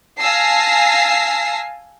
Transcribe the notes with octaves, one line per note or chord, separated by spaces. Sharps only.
F5 G#5 A5 E6 A#6 C7